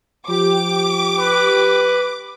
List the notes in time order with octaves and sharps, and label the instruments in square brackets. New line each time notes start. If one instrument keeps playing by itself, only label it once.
[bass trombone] F3 [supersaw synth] G4 [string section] D6
[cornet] B4